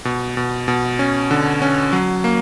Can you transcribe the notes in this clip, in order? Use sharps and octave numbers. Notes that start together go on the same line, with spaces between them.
B2
B2
B2
C#4
D3
C#4
F#3
A#3